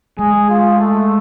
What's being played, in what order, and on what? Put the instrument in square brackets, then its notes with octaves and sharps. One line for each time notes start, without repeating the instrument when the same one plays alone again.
[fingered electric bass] G#3 [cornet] G#4
[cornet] F4
A3